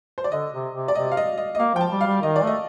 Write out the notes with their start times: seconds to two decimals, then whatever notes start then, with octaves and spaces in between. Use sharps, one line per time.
0.18 C5
0.24 D5
0.32 D3 D#5
0.53 C3
0.75 C3
0.88 D5
0.95 C3 D#5
1.12 F5
1.17 D#5
1.37 D#5
1.55 D#5
1.59 A#3 F5
1.75 F3 G5
1.81 A5
1.91 G3
2.01 F5
2.07 G3
2.22 D#3 D#5
2.36 D5
2.43 A3 D#5